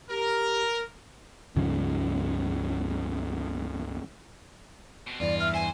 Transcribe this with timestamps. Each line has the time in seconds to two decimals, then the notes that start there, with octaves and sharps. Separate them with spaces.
0.10 G4 A#4
1.56 C#2 G2 C#3 F3
5.07 B2 C4
5.20 E2 G2 E3 F4 D5
5.40 E5 F6
5.54 C5 G#5